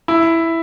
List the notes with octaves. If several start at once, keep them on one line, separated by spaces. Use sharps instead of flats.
E4